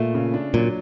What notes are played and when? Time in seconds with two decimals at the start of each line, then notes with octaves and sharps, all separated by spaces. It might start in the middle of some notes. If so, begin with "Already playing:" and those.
Already playing: A#2 A3
0.14 C#3
0.34 D4
0.54 A#2 F#3